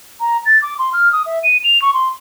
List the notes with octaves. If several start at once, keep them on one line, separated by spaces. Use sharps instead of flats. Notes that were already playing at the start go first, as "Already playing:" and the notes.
A#5
A6
D6
C6
F6
D#6
E5
D#7
F7
C#6
C6